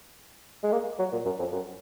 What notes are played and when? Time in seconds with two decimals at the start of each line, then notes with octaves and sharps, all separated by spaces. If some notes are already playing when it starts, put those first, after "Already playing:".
0.64 G#3
0.73 A#3
0.99 F#3
1.12 A#2
1.26 F#2
1.39 F2
1.53 F#2